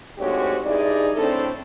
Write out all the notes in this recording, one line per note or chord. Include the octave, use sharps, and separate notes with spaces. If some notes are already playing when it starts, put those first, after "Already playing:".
D2 G#2 C4 F#4 G4 C#5
G2 D#4 E4 G#4 D5
A2 D3 C4 D4 A4